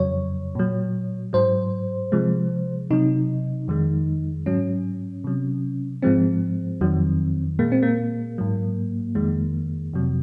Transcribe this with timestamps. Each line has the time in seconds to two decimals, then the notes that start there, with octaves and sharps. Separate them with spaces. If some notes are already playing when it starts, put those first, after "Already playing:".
Already playing: F2 C#3 F#3 C#5
0.55 A#2 F#3
1.33 G#2 F#3 C5
2.12 C3 F3 G#3
2.91 C3 F#3 D#4
3.68 F2 D#3 G#3
4.46 G#2 F#3 C#4
5.24 C3 F#3
6.02 G#2 F3 G#3 C4
6.81 F2 D#3 F#3
7.59 A#2 G#3 A#3
7.72 C4
7.83 A#3
8.38 G#2 F#3
9.15 F2 D#3 G#3
9.93 F2 C3 F#3